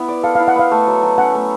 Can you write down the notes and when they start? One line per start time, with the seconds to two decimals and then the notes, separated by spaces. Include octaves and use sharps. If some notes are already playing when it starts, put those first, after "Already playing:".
Already playing: B3 E4
0.08 D5
0.23 A4 F5
0.35 F5
0.40 E4
0.48 F#5
0.56 B3 F5
0.71 A3
0.87 F#3
1.03 F#3
1.18 C#4 F#5
1.35 A3